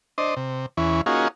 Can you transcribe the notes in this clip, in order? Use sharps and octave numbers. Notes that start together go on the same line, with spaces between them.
D4 C5 D#5
C3
E2 E3 C#4
A#3 C#4 D#4 F4 F#4 G#4